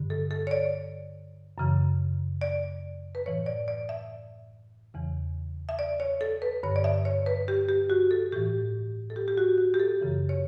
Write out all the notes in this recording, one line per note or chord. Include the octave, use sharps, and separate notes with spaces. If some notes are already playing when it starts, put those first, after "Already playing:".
Already playing: G2 D3
A4
A4
C#5
D5
F#2 C#3 E3
D5
B4
A2 E3 C#5
D5
D5
E5
E2 C#3 E3
E5
D5
C#5
A4
B4
G2 D3 C#5
D5
E5
C#5
B4
G4
G4
F#4
A4
A2 E3 G4
A4
G4
G4
F#4
F#4
G4
A4
F#2 C#3 E3
C#5